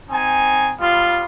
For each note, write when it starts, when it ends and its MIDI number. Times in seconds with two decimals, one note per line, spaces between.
0.11 0.73 60
0.11 0.73 63
0.11 0.73 80
0.80 1.25 55
0.80 1.25 59
0.80 1.25 65